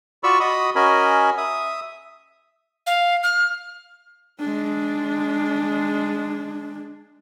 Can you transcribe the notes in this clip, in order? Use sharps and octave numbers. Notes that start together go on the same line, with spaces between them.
F4 F#4 D5 B5 C#6 E6
F#4 D#5 B5 D#6
C#4 F#4 A#4 D#5 G#5 B5
E5 D#6
F5
F6
G#3 D4